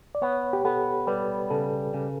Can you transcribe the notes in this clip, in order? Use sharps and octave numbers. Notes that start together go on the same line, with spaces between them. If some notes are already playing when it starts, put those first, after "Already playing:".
D5
B3 C#5
G4
B3 A4
G3 B4
C#3 A4
C#3